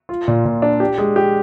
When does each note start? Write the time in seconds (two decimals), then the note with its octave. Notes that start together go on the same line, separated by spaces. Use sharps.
0.09 F4
0.28 A#2
0.45 A#2
0.62 D4
0.80 G4
0.98 G#3
1.16 G4